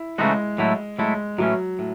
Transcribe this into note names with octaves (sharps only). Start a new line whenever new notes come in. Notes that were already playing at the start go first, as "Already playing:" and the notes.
Already playing: E4
C#3 E3 G#3 A3 D#4 F#4
A2 F#3 A3 E4
A2 F#3 G#3 A3 E4
A2 E3 F#3 A3 C#4
A2